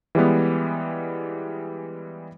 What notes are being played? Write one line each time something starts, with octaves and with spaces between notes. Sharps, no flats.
E3 G3 G#3 B3